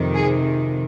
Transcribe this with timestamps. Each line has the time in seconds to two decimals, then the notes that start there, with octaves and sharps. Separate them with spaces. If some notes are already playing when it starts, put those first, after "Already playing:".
Already playing: F2 C3 D#3
0.14 G#4